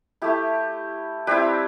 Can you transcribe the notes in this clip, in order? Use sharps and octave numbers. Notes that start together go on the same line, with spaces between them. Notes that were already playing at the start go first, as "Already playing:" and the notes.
A3 E4 G4
G3 C4 E4 G4 B4